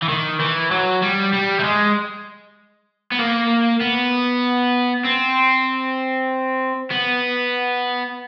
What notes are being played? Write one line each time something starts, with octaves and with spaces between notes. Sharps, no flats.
E3
D#3
E3
F#3
G3
G3
A3
G#3
B3
A#3
B3
C4
B3